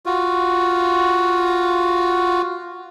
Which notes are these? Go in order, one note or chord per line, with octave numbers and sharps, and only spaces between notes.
F4 F#4